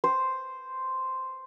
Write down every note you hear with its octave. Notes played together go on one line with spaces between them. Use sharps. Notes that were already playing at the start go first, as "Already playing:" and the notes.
C5